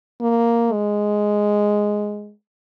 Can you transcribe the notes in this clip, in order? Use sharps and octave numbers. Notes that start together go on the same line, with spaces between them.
A#3
G#3